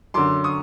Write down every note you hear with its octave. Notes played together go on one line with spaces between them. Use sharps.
F#2 D3 C6 D6
C#6 D#6